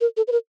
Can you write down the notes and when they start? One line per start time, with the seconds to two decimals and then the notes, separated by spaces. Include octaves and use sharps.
0.01 A#4
0.17 A4
0.28 B4
0.32 A#4